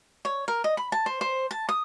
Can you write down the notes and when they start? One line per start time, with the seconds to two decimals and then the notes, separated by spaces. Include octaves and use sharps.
0.25 C#5
0.48 A#4
0.64 D#5
0.77 B5
0.92 A5
1.06 C5
1.21 C5
1.51 A5
1.69 D#6